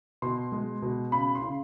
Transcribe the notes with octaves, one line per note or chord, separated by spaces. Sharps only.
B2 C6
G#3
B2
C#3 B5
C6
C#3